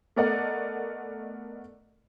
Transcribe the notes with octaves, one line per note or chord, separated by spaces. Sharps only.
A3 B3 A#4 D5 D#5 F#5